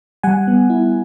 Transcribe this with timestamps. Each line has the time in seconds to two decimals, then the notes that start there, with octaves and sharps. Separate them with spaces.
0.23 G3 F#5 G#5
0.47 B3
0.70 E4